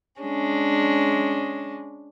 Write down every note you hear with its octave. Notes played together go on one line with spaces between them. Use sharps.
G#3 C#4 D4